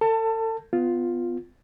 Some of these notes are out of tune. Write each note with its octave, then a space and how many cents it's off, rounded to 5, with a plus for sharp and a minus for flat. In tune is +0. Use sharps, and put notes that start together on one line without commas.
A4 +35 A5 +20
B3 +20 F4 +0